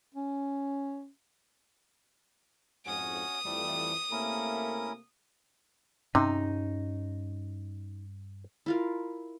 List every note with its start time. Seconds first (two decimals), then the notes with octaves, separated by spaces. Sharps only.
0.14 C#4
2.86 F2 G#2 C#4 F#4 C#5 D#6
3.45 F2 E3 G3 A3
4.11 C3 A3 A#3 C#4 E4 A#4
6.15 G2 C3 C#4 D#4
8.66 E4 F4 A#4